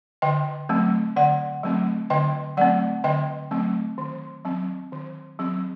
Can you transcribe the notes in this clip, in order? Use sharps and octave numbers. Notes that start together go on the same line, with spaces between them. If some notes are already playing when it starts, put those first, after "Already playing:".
D3 D#5 G5
F#3 A3 C4
D3 D5 F#5
F#3 A3 C4
D3 D#5 G5
F#3 A3 C4 D5 F#5
D3 D#5 G5
F#3 A3 C4
D#3
F#3 C4
D#3
F#3 C4